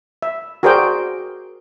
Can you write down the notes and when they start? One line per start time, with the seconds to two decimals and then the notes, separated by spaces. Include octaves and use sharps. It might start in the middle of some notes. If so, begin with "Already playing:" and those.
0.22 E5
0.63 F#4 G#4 A#4 C5 D5 G5